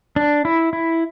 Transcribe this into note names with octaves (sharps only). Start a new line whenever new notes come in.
D4
E4
E4